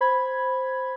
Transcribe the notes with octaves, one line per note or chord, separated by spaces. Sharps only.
C5 B5 G#6